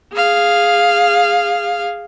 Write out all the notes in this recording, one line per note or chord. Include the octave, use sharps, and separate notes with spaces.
G#4 F5